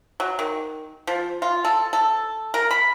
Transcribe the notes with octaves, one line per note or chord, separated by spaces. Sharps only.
F#3
D#3
F3
F4
A4
A4
A#4
B5